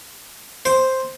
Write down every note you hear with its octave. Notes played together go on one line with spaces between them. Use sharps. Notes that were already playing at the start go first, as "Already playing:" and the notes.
C5